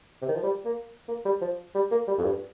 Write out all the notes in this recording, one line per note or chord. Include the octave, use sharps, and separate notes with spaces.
C3
D#3
F3
G3
A#3
A#3
G3
F3
G3
A#3
G3
F2
G2